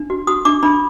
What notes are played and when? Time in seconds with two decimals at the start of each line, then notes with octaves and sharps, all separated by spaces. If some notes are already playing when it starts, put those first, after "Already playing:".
Already playing: D4
0.10 F#4
0.27 F#4 D#6
0.45 D4 D6
0.63 D4 B5